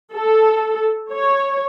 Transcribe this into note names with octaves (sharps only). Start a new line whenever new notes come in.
A4
C#5